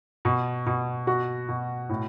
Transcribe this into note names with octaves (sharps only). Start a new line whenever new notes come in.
B2
B2
B2 F#4
B2
A2